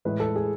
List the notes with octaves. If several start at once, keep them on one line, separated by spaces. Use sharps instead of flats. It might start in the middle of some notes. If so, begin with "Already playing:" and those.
A2 E3 G#3 B4
A4
G#4